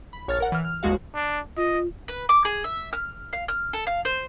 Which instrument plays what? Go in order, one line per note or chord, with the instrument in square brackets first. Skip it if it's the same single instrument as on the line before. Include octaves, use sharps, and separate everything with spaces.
[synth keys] B5
A#1 C#5 F6 A6
A#4 F#5
E3 F6
F6
G1 D#2 G#3 F#4 F5
[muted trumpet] D4
[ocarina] F4 [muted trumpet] D#5
[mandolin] B4
D6
G#4
E5
F6
F5
F6
A4
F5
C5